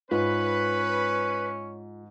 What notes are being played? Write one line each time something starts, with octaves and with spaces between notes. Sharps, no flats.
G#2 C#4 F4 B4